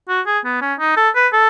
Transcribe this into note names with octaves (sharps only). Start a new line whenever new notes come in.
F#4
G#4
B3
C#4
D#4
A4
B4
A4